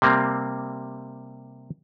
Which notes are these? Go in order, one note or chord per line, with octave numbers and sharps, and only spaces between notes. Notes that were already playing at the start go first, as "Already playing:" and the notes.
C3 G3 A#3 C4